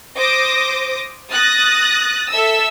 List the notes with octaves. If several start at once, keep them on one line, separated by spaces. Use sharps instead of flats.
C5 D6 D#6 A#6
D#6 F#6 A6 A#6
A4 E5 E6